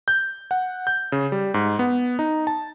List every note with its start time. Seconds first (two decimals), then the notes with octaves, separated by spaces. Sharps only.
0.08 G6
0.51 F#5
0.87 G6
1.12 C#3
1.32 G3
1.54 G#2
1.79 B3
2.19 D#4
2.47 A5